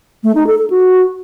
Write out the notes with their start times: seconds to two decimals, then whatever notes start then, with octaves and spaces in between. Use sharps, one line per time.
0.24 A3
0.35 D#4
0.47 A4
0.59 A4
0.70 F#4